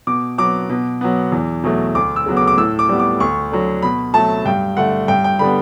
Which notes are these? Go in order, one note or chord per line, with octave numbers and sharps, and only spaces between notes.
B2 D6
F#3 B3 D6
B2
F#3 B3
E2
B2 F#3 A3
D2 D6
E6
C#3 F#3 B3
D6
D6
A2 E6
D6
G3 B3
D6
D2 C#6
D3 F#3
B2 B5
F#3 A3 A5
G2 G5
D3 A3 F#5
G2 G5
G5
D3 G3 B3 B5